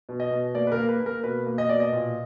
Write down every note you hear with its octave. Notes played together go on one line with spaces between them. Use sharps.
B2
D#5
B2
A#3 D5
B4
A#4
A#3
B4
A#3
A#4
B2 B4
A#3
D#5
B2 D5
D#5
A#2